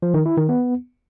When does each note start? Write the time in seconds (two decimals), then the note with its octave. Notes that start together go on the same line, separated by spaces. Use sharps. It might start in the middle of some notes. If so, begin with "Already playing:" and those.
0.02 F3
0.14 D#3
0.26 E4
0.37 D#3
0.49 B3